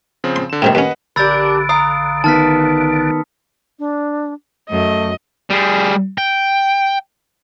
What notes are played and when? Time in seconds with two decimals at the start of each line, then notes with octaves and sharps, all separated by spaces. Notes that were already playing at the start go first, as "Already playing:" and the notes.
0.24 C#3 F3 C4
0.36 C6
0.50 D3 E7
0.62 F#2 A2 C3 D#3 G3 E7
0.75 D#2 C#4 B4 D#5 F#5
1.16 A#1 D3 D4 G4 A#4 B5 E6 A6
1.69 F5 A#5 D#6
2.24 D#3 B3 A5 F6 B6
3.79 D4
4.70 F#2 A3 D#5
5.50 G3 G#4
6.18 G5